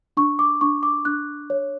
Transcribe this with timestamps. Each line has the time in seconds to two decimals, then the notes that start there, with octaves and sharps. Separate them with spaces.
0.17 D4 C#6
0.39 D6
0.61 D4 C#6
0.83 D6
1.05 D4 F#6
1.50 C#5